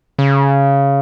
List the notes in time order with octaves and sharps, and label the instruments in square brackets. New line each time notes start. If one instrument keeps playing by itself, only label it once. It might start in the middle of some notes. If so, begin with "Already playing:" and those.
[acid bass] C#3